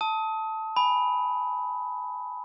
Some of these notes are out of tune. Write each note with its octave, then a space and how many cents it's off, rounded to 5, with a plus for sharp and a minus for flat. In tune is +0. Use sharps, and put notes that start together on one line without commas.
A5 +0 D#6 +30
G#5 +0 B5 +0